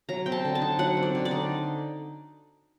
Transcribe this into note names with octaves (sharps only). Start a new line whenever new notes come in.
F#3 A#5
C4 G5
A5
D3
A5
D#4
F#3 F#5
C4
D5
D3
D5
D#4